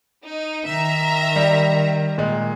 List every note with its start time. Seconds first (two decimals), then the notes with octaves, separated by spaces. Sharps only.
0.24 D#4
0.67 D#3 E5 A#5
1.36 G3
2.18 A#2 G#3